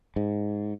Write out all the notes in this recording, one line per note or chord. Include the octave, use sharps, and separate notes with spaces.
G#2